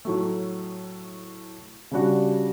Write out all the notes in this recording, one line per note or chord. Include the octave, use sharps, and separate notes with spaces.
A2 F#3 A3
C#3 G3 D4 F#4